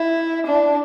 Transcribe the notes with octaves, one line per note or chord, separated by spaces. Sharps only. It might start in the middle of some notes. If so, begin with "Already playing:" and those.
Already playing: E4
D4